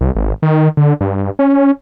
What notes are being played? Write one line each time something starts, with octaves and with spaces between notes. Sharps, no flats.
C2
G#1
D#3
D3
G2
C#4